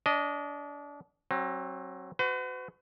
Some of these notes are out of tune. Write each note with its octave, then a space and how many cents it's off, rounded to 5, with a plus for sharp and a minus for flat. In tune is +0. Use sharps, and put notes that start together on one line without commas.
D4 -30 D#5 +0
F#3 +15 C4 +35
F#4 +0 B4 +45